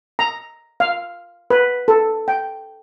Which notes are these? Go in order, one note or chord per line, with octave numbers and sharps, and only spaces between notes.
A#5
F5
B4
A4
G5